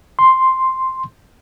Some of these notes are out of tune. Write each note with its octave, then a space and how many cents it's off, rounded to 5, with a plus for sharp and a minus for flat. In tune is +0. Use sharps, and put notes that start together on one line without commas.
C6 +0